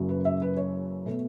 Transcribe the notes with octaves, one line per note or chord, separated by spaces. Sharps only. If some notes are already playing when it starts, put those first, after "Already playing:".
Already playing: F#1 F#2 C#3 F#3
B4
E5
B4
C#5
B2 A3